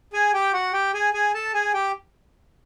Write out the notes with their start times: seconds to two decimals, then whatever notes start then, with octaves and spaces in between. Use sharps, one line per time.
0.13 G#4 G#5
0.34 G4 G5
0.53 F#4 F#5
0.73 G4 G5
0.94 G#4 G#5
1.14 G#4 G#5
1.34 A4 A5
1.54 G#4 G#5
1.74 G4 G5